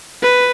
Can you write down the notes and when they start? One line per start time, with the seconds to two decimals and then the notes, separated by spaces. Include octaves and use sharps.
0.23 B4